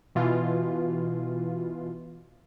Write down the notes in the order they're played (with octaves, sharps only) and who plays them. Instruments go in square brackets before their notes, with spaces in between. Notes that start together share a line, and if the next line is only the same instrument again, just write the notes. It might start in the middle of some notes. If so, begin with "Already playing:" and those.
[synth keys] B2 E3 F4